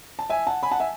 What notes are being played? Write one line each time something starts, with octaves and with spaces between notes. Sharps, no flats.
A5
E5 G#5
F#5 A5
G#5 B5
F#5 A5
E5 G#5